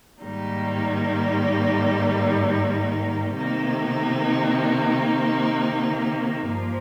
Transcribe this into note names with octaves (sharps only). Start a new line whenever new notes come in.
G#2 D#3 G3 A#3 D#4
C3 D#3 A#3 D#4
G2 F3 A#3